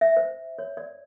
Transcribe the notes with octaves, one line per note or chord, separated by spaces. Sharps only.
E5
C5
C#5
D5